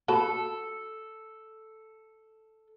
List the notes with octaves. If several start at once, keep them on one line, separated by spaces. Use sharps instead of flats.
F#4 A4 A5 B5